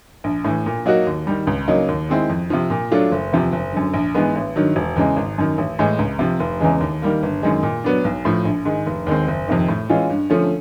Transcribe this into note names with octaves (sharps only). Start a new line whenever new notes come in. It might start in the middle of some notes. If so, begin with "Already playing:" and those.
A#1
A2 E3
A#2
F#3 A#3 D#4 F#4
D#2
D#3 G3
C#2
C#3 F#3 A#3 D#4
D#2
D#3 G#3 C4 E4
F2
C3 F3
A#2
F#3 A3 D4 F4
F#1
E2 C3 F3
F#1
F#2 D3
A#1
G#2 E3 G#3 B3
A1
G2 D#3 F#3
E1
E2 C#3 E3 G#3
G#1
F#2 D#3
A1
A2 E3 G#3
C#2
C3 F3
F1
E2 C#3 E3 G#3
D#2
D#3 G3 A#3
G1
F#2 D#3 G#3
A#2
F#3 B3 D4
B1
A2 F3
A#1
G#2 D#3 G#3
F1
D#2 D#3 G#3 C4
F#1
F2 C3 D#3
A2
E3 G#3 C#4 F4
G2
D3 F3 A3 C#4